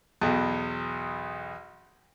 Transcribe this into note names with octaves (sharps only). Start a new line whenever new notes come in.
B1 E2